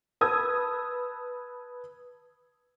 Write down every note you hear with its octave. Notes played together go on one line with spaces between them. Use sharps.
B4 A5 D#6 E6 G#6